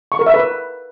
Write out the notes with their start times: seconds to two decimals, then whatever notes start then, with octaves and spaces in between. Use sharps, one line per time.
0.12 C#6
0.19 A#4
0.26 E5
0.34 B4